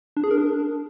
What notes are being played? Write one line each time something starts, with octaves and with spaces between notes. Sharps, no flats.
D4
G#4
A#4
D4